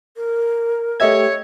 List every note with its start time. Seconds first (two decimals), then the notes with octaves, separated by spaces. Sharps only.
0.17 A#4
1.00 A3 G4 C#5 D#5 E5 G#6